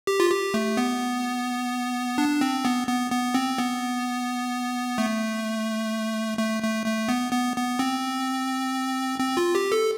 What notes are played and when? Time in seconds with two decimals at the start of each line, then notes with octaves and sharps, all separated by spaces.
0.07 G4
0.20 F4
0.30 G4
0.54 A3
0.77 B3
2.18 D4
2.41 C4
2.65 B3
2.88 B3
3.12 B3
3.34 C4
3.58 B3
4.98 A3
6.38 A3
6.63 A3
6.86 A3
7.08 B3
7.32 B3
7.56 B3
7.79 C4
9.20 C4
9.37 F4
9.55 G4
9.72 A4